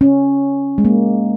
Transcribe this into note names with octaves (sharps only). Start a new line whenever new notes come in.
C#4
G#3
A#3